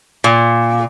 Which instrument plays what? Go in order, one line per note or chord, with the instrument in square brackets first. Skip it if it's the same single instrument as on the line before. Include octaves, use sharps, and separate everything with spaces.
[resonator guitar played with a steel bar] A#2